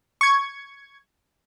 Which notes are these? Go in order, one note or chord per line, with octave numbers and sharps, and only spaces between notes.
C#6 G#6